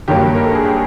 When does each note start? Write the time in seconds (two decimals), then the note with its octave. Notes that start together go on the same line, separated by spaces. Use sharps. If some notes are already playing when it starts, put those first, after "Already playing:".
0.08 G2 D#3 F#3 A#3 G4
0.35 A#4
0.45 A4
0.55 G#4
0.65 G4